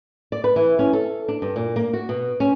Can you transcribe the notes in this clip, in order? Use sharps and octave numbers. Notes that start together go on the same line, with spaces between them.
D5
B4
E3
C#4
A4
D4
G2
A#2
A#3
F#4
B2
C#4